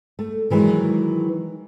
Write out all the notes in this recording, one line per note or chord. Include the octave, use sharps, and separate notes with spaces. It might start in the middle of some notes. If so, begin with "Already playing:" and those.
A3
D#3 E3 F#3 G#3